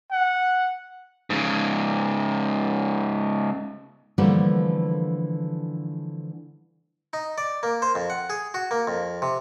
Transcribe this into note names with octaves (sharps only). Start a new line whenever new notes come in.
F#5
G#2 C#3
D3 E3 F3 G3 A3 A#3
D#4
D5
A#3
C5
F2
F#5
G#4
F#4
A#3
F2
C3